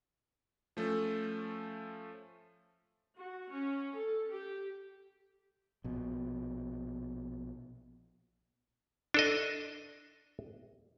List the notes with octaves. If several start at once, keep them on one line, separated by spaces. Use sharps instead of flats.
F3 A3 C#4 A4
F#4
C#4
A4
G4
A#1 B2
D4 A4 D#5